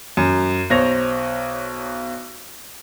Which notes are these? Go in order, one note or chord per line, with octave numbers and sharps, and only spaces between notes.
F#2
B1 C5 C#5 A#6 F7